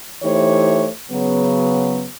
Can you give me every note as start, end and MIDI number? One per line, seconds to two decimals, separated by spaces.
0.23 0.88 52
0.23 0.88 57
0.23 0.88 63
0.23 0.88 67
0.23 0.88 72
0.23 0.88 73
1.11 2.07 49
1.11 2.07 54
1.11 2.07 59